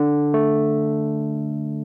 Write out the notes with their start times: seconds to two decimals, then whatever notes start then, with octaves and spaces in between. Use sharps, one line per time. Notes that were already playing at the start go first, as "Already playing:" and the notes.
Already playing: D3
0.34 A3